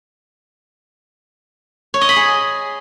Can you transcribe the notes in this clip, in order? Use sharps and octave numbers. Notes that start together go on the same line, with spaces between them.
C#5
D#5
B5
G#4